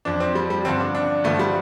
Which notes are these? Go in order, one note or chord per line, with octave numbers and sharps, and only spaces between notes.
F2 F3 D4
C4
G3
G3
G2 D3 F3 C4
D4
D4
G2 D3 F3 A3
G3